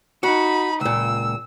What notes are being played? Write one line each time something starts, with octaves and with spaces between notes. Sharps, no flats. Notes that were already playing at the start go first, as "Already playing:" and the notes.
D#4 F#4 B5
C#2 A#2 E6